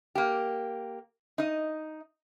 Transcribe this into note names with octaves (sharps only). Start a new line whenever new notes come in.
A#3 G4
D#4 D#5